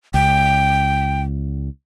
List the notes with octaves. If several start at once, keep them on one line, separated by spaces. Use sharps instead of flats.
C#2 G5